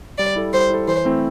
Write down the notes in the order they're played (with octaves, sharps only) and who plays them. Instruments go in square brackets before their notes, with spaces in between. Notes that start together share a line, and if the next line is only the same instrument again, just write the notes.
[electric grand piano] G3 [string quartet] D5
[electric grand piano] E4 A4
[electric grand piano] G3 [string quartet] C5
[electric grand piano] E4 A4
[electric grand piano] E3 [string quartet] C5
[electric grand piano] A3 C4 E4